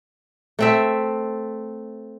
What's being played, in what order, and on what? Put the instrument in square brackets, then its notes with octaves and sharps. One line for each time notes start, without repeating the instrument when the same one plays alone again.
[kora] A3 C4 E5